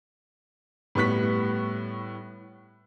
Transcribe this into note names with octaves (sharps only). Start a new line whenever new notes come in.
A2 G3 B3 C#6 F#6 B6